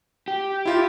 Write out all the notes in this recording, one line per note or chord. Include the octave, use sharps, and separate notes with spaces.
G4
E4 F4